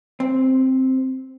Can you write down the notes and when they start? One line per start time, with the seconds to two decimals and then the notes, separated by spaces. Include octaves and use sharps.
0.20 C4